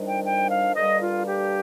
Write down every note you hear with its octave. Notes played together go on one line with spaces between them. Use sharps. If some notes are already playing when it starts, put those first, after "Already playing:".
Already playing: F2 D#3 G3 D4
G5
G5
F5
G2 D3 G3 A#3 D4 D#5
F4
G4